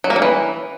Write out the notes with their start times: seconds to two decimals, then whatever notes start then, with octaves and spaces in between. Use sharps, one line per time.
0.04 F#3
0.10 A#3
0.16 F#3
0.22 E3